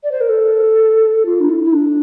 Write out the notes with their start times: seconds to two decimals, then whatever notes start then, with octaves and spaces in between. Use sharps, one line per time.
0.04 D5
0.12 C5
0.21 A#4
0.29 A4
1.25 F4
1.40 D4
1.49 E4
1.64 E4
1.73 D4